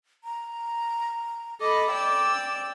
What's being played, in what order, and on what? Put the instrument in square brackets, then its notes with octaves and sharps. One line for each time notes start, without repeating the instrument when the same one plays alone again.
[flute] A#5
[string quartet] A4 D#5 B5 [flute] D6
[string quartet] D5 G5 E6